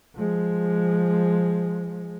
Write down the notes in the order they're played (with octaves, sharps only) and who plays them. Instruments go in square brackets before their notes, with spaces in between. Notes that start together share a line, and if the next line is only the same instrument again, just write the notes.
[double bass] F3 G#3